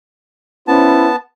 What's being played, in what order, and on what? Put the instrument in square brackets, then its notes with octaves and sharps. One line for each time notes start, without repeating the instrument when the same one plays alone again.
[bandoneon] B3 A5 [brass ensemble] C#4 E4 C5